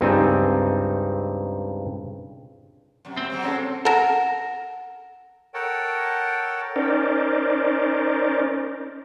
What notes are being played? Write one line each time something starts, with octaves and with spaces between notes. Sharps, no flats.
C#2 G2 C4 D#4 G#5 A5
F#2 C3
C4
F#3 G#3 A#3
C#4 A4
A4 A#4 F#5 A#6 E7
A4 A#4 C#5 F#5 G5 A5
C#4 D#4 A#4 C5 D5